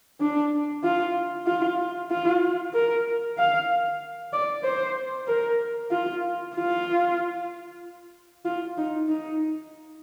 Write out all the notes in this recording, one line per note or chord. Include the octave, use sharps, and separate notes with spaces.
D4
F4
F4
F4
A#4
F5
D5
C5
A#4
F4
F4
F4
D#4
D#4